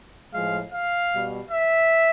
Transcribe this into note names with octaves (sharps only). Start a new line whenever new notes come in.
A2 F3 G#3 F5
F5
B2 G3
E5